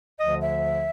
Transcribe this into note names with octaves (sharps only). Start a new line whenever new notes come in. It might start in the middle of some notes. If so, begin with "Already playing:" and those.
D2 D3 F3 D#5
E5